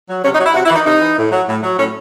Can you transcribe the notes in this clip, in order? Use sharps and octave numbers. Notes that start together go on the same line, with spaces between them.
F#3
C3 C#4
D#4
F#3
E4
C3 F#4
E4
E3
D#4
C3 D#4
E3
A2
F#3
A2
F#3
A2 C#4